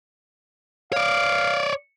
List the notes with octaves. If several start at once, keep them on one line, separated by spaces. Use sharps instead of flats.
C#5 D5 F5